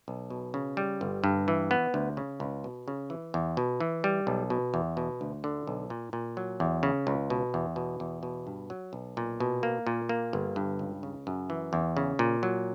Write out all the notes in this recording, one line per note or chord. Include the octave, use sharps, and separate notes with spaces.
B1
B2
C#3
G3
G1
G2
E3
B3
D2
C#3
C#2
B2
C#3
E3
E2
B2
E3
G3
B1
B2
E2
B2
D2
D3
B1
A#2
A#2
F#3
E2
C#3
C#2
B2
E2
B2
E2
B2
G2
F#3
B1
A#2
B2
A#3
A#2
A#3
G1
G2
C#2
C#3
F#2
E3
E2
C#3
A#2
F#3